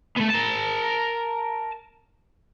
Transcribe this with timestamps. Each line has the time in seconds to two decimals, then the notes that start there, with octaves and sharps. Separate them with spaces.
0.16 A3 B3
0.29 A#4 A5